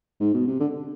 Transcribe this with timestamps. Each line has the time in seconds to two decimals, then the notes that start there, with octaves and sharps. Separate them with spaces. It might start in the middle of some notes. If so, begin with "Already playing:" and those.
0.20 G#2
0.34 B2
0.47 C3
0.60 D3